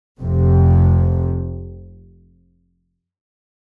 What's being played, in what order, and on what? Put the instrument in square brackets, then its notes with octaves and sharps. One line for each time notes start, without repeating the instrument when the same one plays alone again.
[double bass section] F1 F2 C3